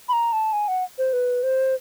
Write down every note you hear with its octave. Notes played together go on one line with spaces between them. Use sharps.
B5
A#5
A5
G#5
F#5
C5
B4
C5